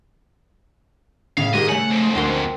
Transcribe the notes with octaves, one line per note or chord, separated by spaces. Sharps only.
A2 C#3 E5 F5
G#2 D#3 G4 G#4 D#5
C#3 A3 F#5 G#5
F2 G#2
D2 C4 A#4 C5